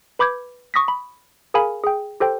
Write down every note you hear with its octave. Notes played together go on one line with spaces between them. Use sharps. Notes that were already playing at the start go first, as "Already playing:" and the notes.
B4 B5 D6 G6 G#6
C#6 D#6 A#6 B6
B5
G#4 A#4 F5 G#5 B5
G#4 G5
G4 A4 C5 G5